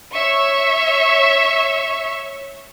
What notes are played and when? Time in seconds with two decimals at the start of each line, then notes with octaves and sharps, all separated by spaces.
0.15 C#5 E5 C#6